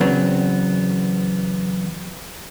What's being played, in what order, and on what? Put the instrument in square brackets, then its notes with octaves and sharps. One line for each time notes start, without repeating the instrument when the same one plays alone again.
[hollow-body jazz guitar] E2 C#3 F#3 B3 C4